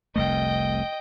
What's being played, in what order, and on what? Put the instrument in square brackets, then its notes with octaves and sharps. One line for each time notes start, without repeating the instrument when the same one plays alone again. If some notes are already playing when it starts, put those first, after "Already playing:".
[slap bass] F1 C2 A3 [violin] D#5 G5